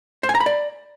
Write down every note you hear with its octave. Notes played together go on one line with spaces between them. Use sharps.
C5
G#5
A#5
B5
D5